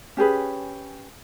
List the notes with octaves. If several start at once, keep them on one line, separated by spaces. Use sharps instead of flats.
C#4 G4 G#4 B4